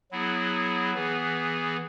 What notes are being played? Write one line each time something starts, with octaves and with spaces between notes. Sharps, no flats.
F#3 B3 E4 G#4
E3 B3 G#4